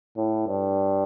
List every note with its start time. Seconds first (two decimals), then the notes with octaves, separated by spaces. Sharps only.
0.17 A2
0.47 G2